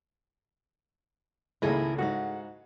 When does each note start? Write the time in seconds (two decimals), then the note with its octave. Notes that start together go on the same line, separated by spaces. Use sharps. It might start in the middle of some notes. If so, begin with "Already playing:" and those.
1.62 G#1 C#2 A#3 E4 G#4 A4
1.98 G#2 F#4 F5 F#5